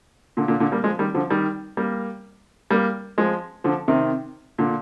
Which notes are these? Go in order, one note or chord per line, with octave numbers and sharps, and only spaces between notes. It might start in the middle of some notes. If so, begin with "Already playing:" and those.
A#2 D3
A#2 D3
A#2 D3
G3 A#3
F3 G#3
D#3 G3
D3 F3
D#3 G3
G3 A#3
G3 A#3
F3 G#3
D3 F3
C3 D#3
A#2 D3